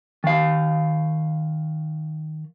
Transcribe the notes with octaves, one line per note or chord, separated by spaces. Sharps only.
D#3 F5